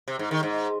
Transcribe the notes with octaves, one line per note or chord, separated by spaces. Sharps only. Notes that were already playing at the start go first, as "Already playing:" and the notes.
C3
G#2
D#3
G#2